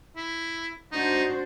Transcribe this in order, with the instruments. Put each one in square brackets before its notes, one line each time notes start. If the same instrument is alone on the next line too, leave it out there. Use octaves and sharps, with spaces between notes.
[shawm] E4
[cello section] D4 F#4 C5 [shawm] D#4